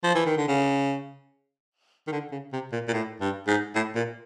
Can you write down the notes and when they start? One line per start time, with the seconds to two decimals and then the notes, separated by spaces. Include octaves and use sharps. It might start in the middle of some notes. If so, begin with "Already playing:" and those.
0.04 F3
0.15 E3
0.26 D#3
0.37 D3
0.48 C#3
2.07 D#3
2.12 D3
2.32 C#3
2.53 C3
2.72 A#2
2.88 A#2
2.93 A2
3.21 G2
3.47 G#2
3.75 A2
3.96 A#2